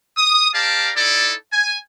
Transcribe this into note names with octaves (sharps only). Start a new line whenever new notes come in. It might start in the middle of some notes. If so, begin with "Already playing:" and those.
D#6
G4 A#4 D5 F5 A5
D#4 E4 A4 D5
G#5